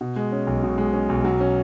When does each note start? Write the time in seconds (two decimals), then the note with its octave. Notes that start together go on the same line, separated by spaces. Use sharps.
0.01 B2
0.16 G#3
0.32 C#4
0.47 B1
0.63 B2
0.78 G#3
0.93 C#4
1.09 B1
1.24 F#3
1.40 C#4